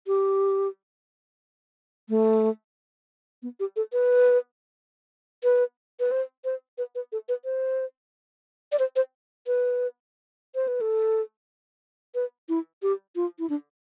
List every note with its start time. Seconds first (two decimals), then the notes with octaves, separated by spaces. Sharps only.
0.07 G4
2.09 A3
3.43 B3
3.60 G4
3.76 A4
3.93 B4
5.44 B4
6.00 B4
6.11 C5
6.45 C5
6.78 B4
6.95 B4
7.12 A4
7.29 B4
7.45 C5
8.72 D5
8.79 C5
8.96 C5
9.47 B4
10.55 C5
10.68 B4
10.81 A4
12.15 B4
12.49 E4
12.82 G4
13.16 F4
13.39 E4
13.50 D4